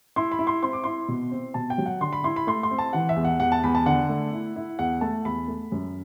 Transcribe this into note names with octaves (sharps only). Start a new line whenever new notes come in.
E4 C6
B5
E4
C6
C4 C6
D6
E4 C6
B2
C4
B2 A5
G5
F#3
F#5
D3 C6
B5
E4 C6
B5
A3 C6
C6
C4
A5
E3 F#5
E5
E2
F#5
E2 F#5
A5
E2 B5
A5
D3 F#5
A3
E4
E4
E2 F#5
A3 A5
E2 B5
A3
F#2